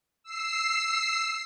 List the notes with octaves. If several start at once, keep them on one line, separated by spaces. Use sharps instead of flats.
E6 C7